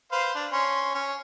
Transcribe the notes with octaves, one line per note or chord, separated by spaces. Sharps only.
B4 C5 F5
D4
C#4 C6
C#4